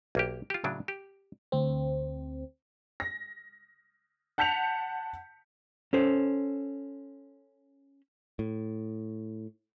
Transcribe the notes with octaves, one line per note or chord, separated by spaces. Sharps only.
B1 A#3 G4
F4 G4
A2 C#3 F#3 D4
G4
D2 C4
A#6
F#5 A5 G6 B6 C#7 F7
C#4 A4 C5
A2